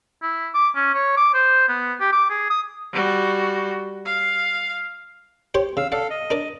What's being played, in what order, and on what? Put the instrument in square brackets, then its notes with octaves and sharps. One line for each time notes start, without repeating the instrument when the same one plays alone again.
[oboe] E4
D6
C#4
C#5
D6
C5
B3
G4
D6
G#4
D#6
[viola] G3 F#4
F5
[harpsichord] G4 C5 C#5
[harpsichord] C#3 [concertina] F5 E6
[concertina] A4 F5 [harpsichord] D5 F#5
[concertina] D#5
[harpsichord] D4 A#4 D5